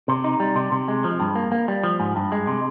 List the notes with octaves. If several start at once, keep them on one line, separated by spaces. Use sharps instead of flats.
C3
D#4
G3
C3
C3
G#3
F3
G2
A#3
A#3
G3
F3
G#2
G2
G#3
C3